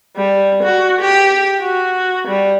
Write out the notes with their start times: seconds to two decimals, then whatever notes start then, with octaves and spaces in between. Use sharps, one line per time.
0.16 G3
0.63 F#4
1.01 G4
1.60 F#4
2.27 G3